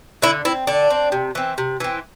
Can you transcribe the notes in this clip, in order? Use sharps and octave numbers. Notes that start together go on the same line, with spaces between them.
D3 E4
C4 E4
D3 D4
C4
C3
E3 C4
C3
E3 C4